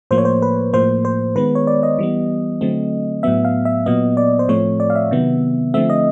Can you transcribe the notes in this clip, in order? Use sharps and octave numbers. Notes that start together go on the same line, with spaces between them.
A2 F3 A#3 C5
C#5
C5
B4
A2 F3 A#3 C5
C5
D#3 G#3 B3 B4
C#5
D5
D#5
E3 G3 B3
D3 F#3 A3 C4
A2 F#3 B3 E5
F5
E5
A#2 F#3 B3 D#5
D5
C5
A2 F3 A3 C4 C#5
D5
F5
E5
C3 D#3 F#3 B3
D3 F3 A3 C4 E5
D#5